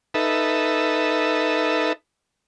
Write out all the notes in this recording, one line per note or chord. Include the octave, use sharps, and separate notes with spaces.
D#4 A4 B4 E5